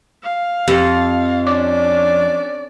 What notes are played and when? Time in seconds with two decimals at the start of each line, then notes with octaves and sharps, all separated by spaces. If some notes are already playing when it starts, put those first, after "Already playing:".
0.23 F5
0.68 F2 G4
1.47 C#4 D4 D5 D6